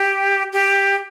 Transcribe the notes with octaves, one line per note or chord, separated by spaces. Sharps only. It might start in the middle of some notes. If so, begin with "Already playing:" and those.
Already playing: G4
G4